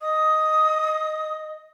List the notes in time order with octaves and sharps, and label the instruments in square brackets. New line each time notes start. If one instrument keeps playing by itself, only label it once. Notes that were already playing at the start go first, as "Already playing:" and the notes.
[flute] D#5 [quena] D#6